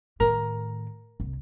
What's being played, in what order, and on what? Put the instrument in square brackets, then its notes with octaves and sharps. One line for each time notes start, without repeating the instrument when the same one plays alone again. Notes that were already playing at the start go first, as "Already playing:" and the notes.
[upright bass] A2 D#3 [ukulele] A#4
[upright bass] C2